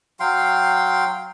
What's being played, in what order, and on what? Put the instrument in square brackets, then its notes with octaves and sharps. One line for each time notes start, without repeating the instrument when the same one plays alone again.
[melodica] F#3 F5 G5 C6